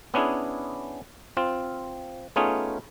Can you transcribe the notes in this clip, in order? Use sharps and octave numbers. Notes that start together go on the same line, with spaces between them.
B3 C#4 D4 E4 G#4
C4 F4
A3 B3 C#4 D#4 F4 G#4